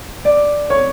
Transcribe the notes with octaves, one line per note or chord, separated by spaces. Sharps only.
D5
C#5